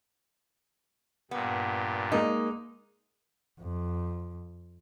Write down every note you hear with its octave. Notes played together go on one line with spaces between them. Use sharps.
G2 A#2 G3 B3
G#3 A#3 D#4
F2